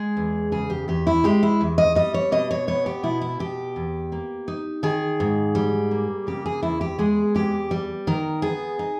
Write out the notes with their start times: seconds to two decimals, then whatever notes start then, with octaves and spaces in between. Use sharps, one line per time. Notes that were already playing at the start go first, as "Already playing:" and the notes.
Already playing: G#3 G#4
0.17 E2
0.52 C#3 G#4
0.70 G4
0.88 E2 G4
1.07 E4
1.24 G#3 G4
1.43 E4
1.61 E2
1.78 D#5
1.95 G3 D#5
2.14 C#5
2.32 B2 D#5
2.51 C#5
2.68 B3 C#5
2.86 G4
3.03 B2 E4
3.21 E4
3.39 B2 G4
3.76 E2
4.12 A#3
4.48 D#4
4.83 D#3 G#4
5.20 G#2
5.55 G3
5.91 A#3
6.27 C#3 G4
6.46 G#4
6.63 E2 E4
6.81 G4
6.98 G#3 G#4
7.35 E2 G4
7.71 G3
8.07 D#3 A#4
8.42 B3 G#4
8.79 D#4